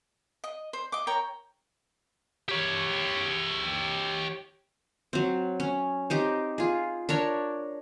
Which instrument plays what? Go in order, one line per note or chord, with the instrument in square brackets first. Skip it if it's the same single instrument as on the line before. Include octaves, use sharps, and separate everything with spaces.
[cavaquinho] D#5
C5
D#5 D6
A#4 C#5 G5 A#5
[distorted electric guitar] G4 C#5
[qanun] F#3 C4
C#4
C4 D#4 G4
F4 G#4
D4 A#4 C#5